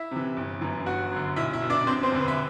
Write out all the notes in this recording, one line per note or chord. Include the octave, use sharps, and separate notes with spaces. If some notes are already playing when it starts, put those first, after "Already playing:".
Already playing: E4 E5
C3 E3
G1
F#2 E3
G1 F#4 F#5
F#2 D3
B1 E4 E5
E4 E5
B2
D4 D5
E1 C4 C5
C4 C5
E2 D3
B4
E5